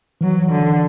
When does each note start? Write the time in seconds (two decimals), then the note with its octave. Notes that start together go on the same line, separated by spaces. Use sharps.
0.21 E3 F#3
0.51 D3